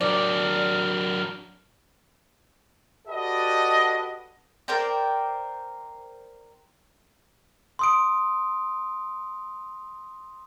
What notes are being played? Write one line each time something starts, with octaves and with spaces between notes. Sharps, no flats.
F#3 D4 A#4 D5
F#4 G4 A4 B4 D5 D#5
A#4 C5 D5 G5
C6 D#6 D7